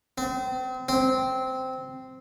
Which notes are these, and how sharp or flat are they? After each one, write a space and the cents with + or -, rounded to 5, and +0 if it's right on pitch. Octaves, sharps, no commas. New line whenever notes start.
C4 -35
C4 -10